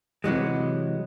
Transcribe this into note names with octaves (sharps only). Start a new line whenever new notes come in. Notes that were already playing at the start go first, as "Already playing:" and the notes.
C3 E3 F#3 G#3